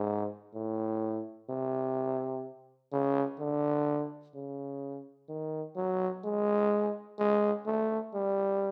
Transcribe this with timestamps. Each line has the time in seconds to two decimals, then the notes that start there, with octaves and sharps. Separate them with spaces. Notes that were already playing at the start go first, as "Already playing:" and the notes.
Already playing: G#2
0.54 A2
1.50 C3
2.92 C#3
3.39 D3
4.35 C#3
5.29 D#3
5.76 F#3
6.24 G#3
7.19 G#3
7.66 A3
8.14 G3